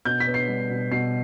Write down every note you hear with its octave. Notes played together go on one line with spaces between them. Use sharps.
B2 G6
B6
B3
C7
G3
B2
B2 C7